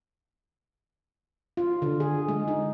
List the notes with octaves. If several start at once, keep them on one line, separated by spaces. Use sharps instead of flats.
F4
D3
G#4
G#3
D#4